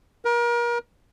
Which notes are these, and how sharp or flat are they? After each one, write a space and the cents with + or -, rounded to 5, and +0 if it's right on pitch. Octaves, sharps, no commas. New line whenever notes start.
A#4 +35